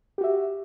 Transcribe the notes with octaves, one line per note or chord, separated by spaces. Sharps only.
F#4 G4 E5